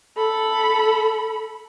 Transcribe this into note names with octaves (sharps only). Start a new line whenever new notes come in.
A4 B5